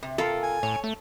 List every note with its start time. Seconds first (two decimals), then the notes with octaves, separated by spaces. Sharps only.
0.03 C3
0.18 C3 F4 A4 A#4
0.43 G#5
0.63 A2 C#5
0.84 A3